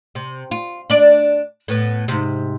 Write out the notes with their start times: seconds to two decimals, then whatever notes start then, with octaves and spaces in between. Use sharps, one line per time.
0.15 C3
0.51 F4
0.90 D4 D5
1.68 A2 B3
2.08 G#2 C3